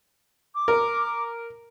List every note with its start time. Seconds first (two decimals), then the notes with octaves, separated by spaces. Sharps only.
0.54 D6
0.68 A#4